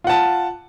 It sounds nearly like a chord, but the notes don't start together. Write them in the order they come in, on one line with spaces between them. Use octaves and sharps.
F4 F#5 A5